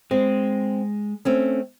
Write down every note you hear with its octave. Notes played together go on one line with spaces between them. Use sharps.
G#3 C4
A3 C4 C#4